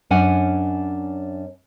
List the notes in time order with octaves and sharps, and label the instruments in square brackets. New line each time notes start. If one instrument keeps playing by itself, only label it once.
[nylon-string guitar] F#2 C#4 D4 F#5 G#5